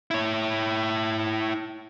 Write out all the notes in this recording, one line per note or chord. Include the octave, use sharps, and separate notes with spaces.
E4 C#5